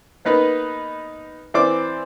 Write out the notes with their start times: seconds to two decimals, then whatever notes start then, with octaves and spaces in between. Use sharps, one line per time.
0.25 A#3 B3 D#4 B4
1.54 E3 C4 C5 D5 D6